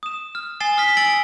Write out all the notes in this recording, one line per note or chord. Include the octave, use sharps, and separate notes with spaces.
D#6 E7
F6
G#5 D#6 A6 C7 E7 G7
D#6 F6 B6
G#5 E6 A6 D7 F#7